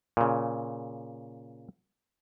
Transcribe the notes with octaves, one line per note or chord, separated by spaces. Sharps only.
A#2 C#3